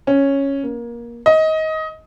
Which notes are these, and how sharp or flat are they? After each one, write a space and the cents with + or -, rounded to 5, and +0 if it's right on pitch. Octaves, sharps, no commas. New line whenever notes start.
C#4 -5
A#3 +20
D#5 +20